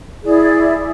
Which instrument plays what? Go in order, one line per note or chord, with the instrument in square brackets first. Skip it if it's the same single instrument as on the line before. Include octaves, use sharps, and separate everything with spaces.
[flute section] E4 G#4 D5